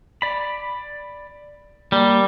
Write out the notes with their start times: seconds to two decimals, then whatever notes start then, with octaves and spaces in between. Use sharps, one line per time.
0.22 D5 B5
1.92 G3 A#3